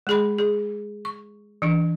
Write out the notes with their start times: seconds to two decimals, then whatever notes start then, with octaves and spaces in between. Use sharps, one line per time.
0.07 G#3 G#4 B5
0.39 G#4
1.05 C#6
1.62 E3 D4